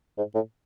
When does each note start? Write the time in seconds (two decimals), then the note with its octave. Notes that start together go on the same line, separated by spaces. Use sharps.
0.18 G#2
0.35 A2